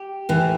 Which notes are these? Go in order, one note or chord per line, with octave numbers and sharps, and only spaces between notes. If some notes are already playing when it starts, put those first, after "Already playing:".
Already playing: G4
A2 E3